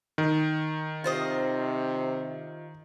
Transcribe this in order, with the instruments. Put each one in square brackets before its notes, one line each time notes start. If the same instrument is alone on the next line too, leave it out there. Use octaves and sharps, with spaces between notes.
[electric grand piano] D#3
[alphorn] C3 [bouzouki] F4 C5 D#5